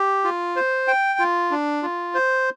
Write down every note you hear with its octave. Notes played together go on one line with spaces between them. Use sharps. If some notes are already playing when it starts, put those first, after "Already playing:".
Already playing: G4
F4
C5
G5
F4
D4
F4
C5